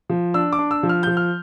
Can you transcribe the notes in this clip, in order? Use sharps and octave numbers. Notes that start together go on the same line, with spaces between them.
F3
D4 E6
D6
D4
E6
F3
F6
F3 G6
F6